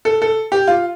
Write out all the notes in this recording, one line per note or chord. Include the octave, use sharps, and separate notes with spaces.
A4
A4
G4
F4